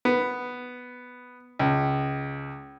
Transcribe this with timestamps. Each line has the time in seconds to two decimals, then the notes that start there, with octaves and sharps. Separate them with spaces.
0.05 B3
1.59 C#2